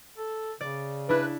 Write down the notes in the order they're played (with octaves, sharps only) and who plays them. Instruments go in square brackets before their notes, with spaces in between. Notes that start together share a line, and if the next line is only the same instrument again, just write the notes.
[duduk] A4
[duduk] C#3 [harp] D5
[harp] D4 E4 [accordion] B4